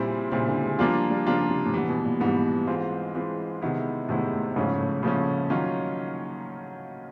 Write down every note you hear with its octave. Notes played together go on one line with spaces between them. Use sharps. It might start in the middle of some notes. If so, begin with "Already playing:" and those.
Already playing: A#2 C#3 G3 C4 E4
A#2 C#3 G3 C4 E4
D3
G#3
F3 G3 A#3 D4 F4
G3
C#3 F3 A#3 D4 F4
C3
A2
A#2 E3 G3 B3
B2
A#2
G#2 E3 G3 B3
E3 G#3 C4 F4
E3 G#3 C4 F4
C3 D#3 G#3 B3 E4
A2 C3 D#3 G#3 B3 E4
A2
G#2 C#3 F3 A3 C#4
A2
A#2 C#3 F3 A3 C#4
D#3 F#3 A#3 C#4 F4